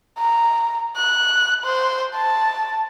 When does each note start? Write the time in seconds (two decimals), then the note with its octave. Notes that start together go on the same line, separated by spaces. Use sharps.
0.19 A#5
0.96 F#6
1.65 C5
2.15 A5